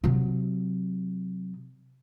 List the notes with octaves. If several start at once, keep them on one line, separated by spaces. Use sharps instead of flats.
C3 F#3